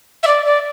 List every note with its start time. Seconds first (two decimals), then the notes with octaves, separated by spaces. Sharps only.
0.23 E5
0.27 D5
0.46 D5